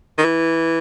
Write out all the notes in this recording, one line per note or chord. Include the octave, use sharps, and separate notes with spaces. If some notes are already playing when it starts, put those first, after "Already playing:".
D#3
E3